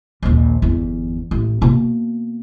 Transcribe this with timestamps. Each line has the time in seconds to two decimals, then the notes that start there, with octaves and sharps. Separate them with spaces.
0.23 A#1 D#2
0.62 G1 E2
1.31 A1
1.61 B2 A#3